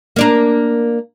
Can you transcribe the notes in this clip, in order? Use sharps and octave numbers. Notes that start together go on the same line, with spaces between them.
A#3 D4 A#4